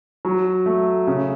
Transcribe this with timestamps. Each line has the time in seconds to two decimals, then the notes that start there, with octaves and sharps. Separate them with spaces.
0.25 F#3
0.66 A3
1.07 C#3